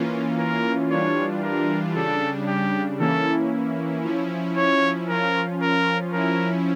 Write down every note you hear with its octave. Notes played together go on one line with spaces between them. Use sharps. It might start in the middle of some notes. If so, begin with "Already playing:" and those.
Already playing: E3 A#3 C#4 F4
A#4
E3 G3 D4 F4 C#5
A#4
C#3 G3 D4 A4
G4
E3 A#3 C#4 E4 A4
F3 C#4 E4
C#5
F3 C#4 F4 A#4
A#4
F3 C#4 E4 A#4